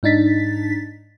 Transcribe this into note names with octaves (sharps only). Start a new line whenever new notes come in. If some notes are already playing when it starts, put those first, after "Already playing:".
G#2 D4 D#4 A6 B6